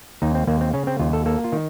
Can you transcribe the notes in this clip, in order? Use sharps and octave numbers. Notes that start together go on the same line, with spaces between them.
D#2 D#4
C4
D#2 A#3
C4
C#3 C#4
C4
D#2 F4
A4
A#3 A4
F4
D#3